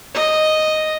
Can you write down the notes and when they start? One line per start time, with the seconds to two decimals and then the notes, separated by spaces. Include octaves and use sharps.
0.14 D#5